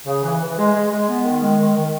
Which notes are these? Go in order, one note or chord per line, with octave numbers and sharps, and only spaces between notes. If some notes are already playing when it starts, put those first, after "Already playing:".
C#3
E3
E3
G#3
G#3
G#3
B3
D#3
G#3
D#3
D#3